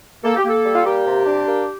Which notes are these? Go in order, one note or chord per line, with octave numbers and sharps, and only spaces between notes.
A#3 A4
G4
A#3 A4
G3
F4
A#3 G4
C3
D4
A#3